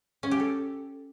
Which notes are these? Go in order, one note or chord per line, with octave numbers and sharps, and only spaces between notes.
C#4
G4
A4